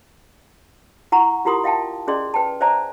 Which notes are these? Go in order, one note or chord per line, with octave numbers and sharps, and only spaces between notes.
E4 F#5 A#5 C#6
E4 F4 G4 A#4 C6 D#6
D#5 F5 G5 A5
C#4 G#4 D5 D#5 C6
B4 G5 A5
C5 D5 E5 G#5 A#5